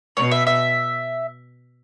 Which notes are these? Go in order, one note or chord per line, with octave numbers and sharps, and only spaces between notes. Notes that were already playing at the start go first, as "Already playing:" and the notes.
B2 C#5
E5
E5